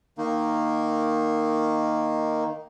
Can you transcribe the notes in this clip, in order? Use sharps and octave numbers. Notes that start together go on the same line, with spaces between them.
D#3 A#3 D#4